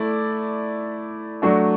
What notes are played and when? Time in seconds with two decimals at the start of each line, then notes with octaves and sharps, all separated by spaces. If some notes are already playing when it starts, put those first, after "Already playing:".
Already playing: A3 E4 D5
1.42 F#3 A3 D4 F#4